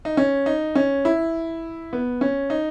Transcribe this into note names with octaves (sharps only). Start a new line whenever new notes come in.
D#4
C#4
D#4
C#4
E4
B3
C#4
D#4